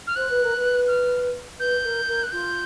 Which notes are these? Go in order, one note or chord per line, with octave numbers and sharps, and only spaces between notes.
F6
C5 F#6
B4
A#4
B4
F6
B4 G6
A#4
A#4
F#6
F4 G6